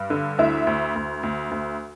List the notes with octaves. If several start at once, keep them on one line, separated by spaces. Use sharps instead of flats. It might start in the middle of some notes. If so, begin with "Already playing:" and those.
Already playing: G2
D3
D2 E4 E5
D2
D2
D2
D2